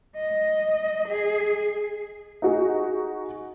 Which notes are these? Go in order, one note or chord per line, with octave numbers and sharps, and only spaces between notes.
D#5
G#4
D#4 F#4 G#4